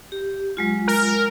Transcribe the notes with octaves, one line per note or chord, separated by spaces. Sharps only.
G4
F#3 G#3 F4
A#4